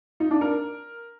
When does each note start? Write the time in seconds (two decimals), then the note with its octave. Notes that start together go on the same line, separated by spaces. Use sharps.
0.20 D#4
0.31 D4
0.41 A#4